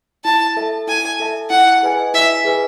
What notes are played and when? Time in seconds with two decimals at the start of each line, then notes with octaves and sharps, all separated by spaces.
0.24 E4 A5
0.57 A4 E5 A5
0.87 E4 G#5
1.20 A4 E5 A5
1.50 E4 F#5
1.83 G#4 B4 D#5 G#5
2.14 E4 E5
2.45 G#4 B4 D#5 G#5